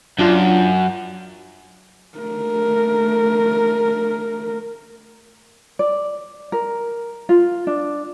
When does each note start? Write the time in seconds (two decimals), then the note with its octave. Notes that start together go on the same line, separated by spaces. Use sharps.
0.19 F#2 D4 F4
2.19 A3 A#4
5.79 D5
6.52 A#4
7.29 F4
7.67 D4